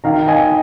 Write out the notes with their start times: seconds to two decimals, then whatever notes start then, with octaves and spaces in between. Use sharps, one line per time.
0.04 D#3 F5 A#5
0.28 D#5 G#5